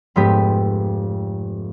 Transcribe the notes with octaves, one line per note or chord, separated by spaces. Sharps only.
F1 G#2 B3 G4 B6